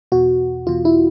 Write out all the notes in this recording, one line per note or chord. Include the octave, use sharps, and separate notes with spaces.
E2 B2 F#4
E2 B2 F4
E4